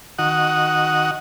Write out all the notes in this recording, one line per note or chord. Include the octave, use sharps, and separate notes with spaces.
D#3 F#4 F#5 D#6